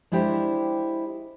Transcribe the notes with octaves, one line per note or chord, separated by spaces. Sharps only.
G#3 D4 E4 G4 C5